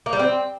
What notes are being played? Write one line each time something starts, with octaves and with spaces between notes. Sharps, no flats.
A#3
G3
C4